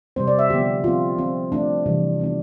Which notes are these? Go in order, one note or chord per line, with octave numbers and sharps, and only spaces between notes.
C3 G3 C4 C5
D5
E5
D3 F3 B3 G4
F3 C4 F4
F3 C4
F3 A3 C4 D4
C3 E3 G3
F3 B3 D4